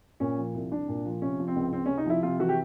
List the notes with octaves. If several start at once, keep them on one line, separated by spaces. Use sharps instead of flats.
A#2 C#4
F3
C2
C2 D4
A#2
F3
C3 C#4
F3
C4
C#2
C#2 C4
C3 C#4
D#4
F3 E4
C3 F4
E3 F#4
G4